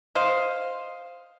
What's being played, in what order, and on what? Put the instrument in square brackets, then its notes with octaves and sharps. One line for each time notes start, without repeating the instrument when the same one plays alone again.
[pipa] C5 D#5 F5